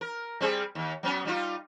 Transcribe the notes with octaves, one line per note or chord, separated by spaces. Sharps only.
A#4
G3 C4 G#4
D#2
F#3 B3 C#4
G3 D#4 F4